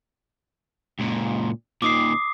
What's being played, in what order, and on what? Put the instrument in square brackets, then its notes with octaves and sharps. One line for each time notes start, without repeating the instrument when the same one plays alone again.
[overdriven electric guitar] C#2 A#2
[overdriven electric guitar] A#2 D#3 [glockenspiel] D6 D#6 C7